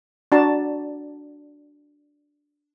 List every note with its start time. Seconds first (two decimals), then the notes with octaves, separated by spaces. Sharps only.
0.32 D4 F#4 D5 A5 A#5